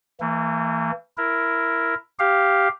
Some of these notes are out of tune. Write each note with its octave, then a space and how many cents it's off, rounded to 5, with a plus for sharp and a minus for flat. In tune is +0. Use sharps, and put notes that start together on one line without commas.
E3 -5 A#3 -45
E4 +10 A#4 +0
G4 +0 F5 +0